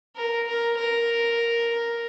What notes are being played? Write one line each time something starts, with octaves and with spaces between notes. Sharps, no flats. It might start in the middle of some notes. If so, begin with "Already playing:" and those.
A#4
A#4
A#4